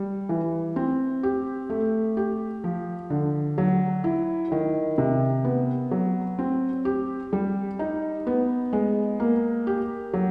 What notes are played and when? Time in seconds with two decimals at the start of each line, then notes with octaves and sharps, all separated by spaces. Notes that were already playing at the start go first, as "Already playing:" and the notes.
Already playing: G3
0.29 E3
0.76 C4
1.23 G4
1.70 A3
2.17 G4
2.64 F3
3.10 D3
3.58 F#3
4.04 E4
4.52 D#3
4.98 C3
5.45 B3
5.91 F#3
6.39 C4
6.85 G4
7.33 G3
7.79 D#4
8.27 B3
8.73 G#3
9.20 A#3
9.67 G4
10.14 F#3